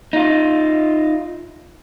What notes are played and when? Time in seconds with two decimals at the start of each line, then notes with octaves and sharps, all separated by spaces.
0.13 D#4 F4